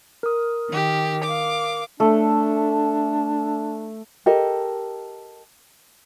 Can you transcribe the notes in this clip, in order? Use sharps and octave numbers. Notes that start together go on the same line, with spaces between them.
A#4 D#6
D#3 G4
F5 D6
A3 D4
G4 A4 A#4 D#5